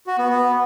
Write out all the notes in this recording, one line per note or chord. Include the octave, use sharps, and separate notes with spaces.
F#4
B3
B3